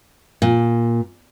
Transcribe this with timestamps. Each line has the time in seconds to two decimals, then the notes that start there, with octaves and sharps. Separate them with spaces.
0.42 A#2